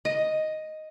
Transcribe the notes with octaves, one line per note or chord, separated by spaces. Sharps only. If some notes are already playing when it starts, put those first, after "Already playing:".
D#5